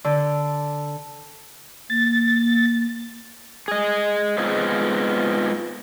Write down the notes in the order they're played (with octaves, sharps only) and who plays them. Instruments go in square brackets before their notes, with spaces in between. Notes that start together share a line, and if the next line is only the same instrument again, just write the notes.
[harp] D3
[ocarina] A#3 [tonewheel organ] A6
[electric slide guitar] G#4 D#5
G#3 B3 C4 D#4 F4 G#4